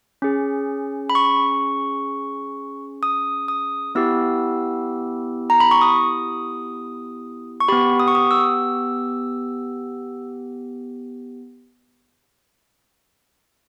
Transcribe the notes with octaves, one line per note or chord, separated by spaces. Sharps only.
C#4 G#4
B5
C#6
D#6
D#6
B3 E4 G4 E6
A#5
B5
C#6
D#6
C#6
B3 G4 B5
D#6
C#6
D#6
E6